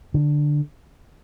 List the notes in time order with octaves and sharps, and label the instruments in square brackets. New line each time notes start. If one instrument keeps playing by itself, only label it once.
[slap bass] D3